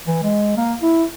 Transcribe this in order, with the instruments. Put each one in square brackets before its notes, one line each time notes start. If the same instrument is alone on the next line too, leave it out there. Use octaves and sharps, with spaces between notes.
[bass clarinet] E3
G#3
A#3
E4